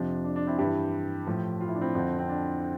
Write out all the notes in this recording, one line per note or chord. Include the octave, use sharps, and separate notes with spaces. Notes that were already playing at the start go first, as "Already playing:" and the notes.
Already playing: F2 C3 F3 D4
D4
D4
C4 E4
G2 E3 E4 G4
A2 F3
F4
E4
D4
C4 E4
F2 D3 F3
C4
D4